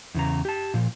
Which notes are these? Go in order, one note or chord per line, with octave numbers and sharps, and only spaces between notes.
E2 C#3 A#5
G4 A5
A#2 F3